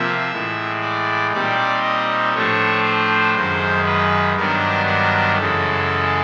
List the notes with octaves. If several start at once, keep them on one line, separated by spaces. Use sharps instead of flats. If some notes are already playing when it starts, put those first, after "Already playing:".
Already playing: C3 F3 A#3 E5
A2 E3 G#3
D5
A#2 G3 C4 D#4 D5
D#5
A2 F3 A3 D4 C#5
C5
F#2 D#3 G#3 C5
B4
G2 D#3 F#3 B3 D4 A#4
A#4
F#2 C#3 E3 G#3 A4